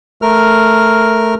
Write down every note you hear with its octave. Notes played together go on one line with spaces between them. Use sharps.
A3 A#4 F6